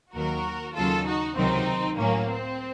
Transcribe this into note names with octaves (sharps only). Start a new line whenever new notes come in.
D#2 D#3 F#3 F#4 A#4
D#2 C#3 F#3 F4 A4
D#4 F#4
C#2 C3 D#3 F#3 C4 D#4
A2 F#3 A#3 C#4
C4